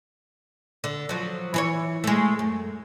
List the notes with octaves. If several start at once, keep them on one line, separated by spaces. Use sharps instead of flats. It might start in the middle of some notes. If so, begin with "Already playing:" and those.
D3
F3 F#3
E3 B4 C#5
G#3 A3
F#2